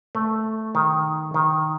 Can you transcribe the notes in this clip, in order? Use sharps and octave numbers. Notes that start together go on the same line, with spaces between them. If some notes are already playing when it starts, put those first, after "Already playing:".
A3
D#3
D#3